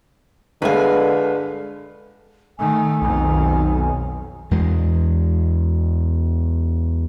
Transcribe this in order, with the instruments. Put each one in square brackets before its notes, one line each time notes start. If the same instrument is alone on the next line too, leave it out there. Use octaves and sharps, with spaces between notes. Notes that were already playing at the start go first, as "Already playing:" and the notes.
[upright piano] G1 G#3 F5 [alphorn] D3 [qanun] B4 G#5
[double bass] D#3 A3 [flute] G#5
[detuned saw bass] B1 [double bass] F2 D#3
[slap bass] E2 G#3